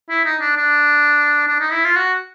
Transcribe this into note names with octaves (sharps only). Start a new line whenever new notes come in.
E4
D#4
D4
D4
D4
D#4
E4
F4
F#4